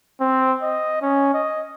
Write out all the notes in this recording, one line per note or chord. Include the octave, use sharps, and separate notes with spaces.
C4
D#5
C#4
D#5